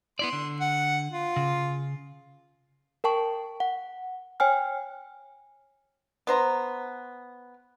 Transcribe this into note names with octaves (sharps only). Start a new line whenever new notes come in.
B3 E4 D5 C6
D3
F#5
F4
C#3
A#4 G5 A5 C#6
F#5
C#5 G5 G#5 F6
B3 C5 A#5